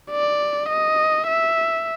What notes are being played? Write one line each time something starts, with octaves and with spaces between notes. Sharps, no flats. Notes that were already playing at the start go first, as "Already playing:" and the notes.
D5
D#5
E5